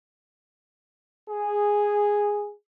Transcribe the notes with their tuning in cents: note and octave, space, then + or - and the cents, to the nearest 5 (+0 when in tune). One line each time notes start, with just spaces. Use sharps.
G#4 -5